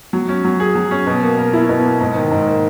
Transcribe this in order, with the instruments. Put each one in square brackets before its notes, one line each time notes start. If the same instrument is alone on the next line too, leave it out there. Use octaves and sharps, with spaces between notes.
[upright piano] F#3
C#4
F#3
G#4
F#3
C#4
B2
A#3
A#4
E4
B2
A#3
G#2
D#3
G#2
A#3